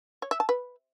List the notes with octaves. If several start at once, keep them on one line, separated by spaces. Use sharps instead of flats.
C#5
E5
A5
B4